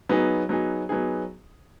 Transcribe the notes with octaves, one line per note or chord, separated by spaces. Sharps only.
F#3 B3 D#4 G#4
F#3 B3 D#4 G#4
F#3 B3 D#4 G#4